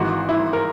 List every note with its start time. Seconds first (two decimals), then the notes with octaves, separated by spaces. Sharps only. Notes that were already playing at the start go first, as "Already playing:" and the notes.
Already playing: G#1 G#2 E3 F#4
0.29 E4
0.53 A#4